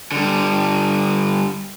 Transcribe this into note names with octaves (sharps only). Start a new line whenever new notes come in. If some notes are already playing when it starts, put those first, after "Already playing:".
D3 G3